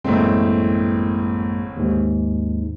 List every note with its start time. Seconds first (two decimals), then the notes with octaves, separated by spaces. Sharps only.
0.04 A1 F#2 A2 G#3 A#3 C4
1.77 D#2 G#2